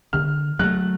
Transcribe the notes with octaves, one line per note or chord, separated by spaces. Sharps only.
D3 F6
F#3 A3 F#6